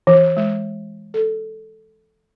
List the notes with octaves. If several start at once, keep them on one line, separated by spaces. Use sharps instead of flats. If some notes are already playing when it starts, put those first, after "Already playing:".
E3
G#3
A4